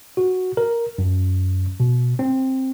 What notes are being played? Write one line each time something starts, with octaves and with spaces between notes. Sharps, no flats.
F#4
A#4
F#2
B2
C4